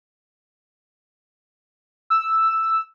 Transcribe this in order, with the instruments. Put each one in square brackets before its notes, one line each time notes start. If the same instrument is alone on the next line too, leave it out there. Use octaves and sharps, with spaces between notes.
[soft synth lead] E6